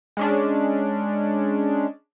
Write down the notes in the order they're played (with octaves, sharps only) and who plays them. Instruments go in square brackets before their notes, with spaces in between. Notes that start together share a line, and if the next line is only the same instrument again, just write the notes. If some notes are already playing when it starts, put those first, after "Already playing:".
[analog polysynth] G#3 C#4 D4